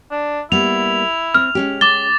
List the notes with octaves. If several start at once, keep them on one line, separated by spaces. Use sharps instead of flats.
D4
G3 A#3 B3 E4 F7
C4 F6
G#3 C#4 G4
D6 A6 G7